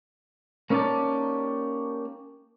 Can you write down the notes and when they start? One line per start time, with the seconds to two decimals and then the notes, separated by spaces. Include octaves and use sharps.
0.70 A#3 C#4 D#4 G4 D5 A5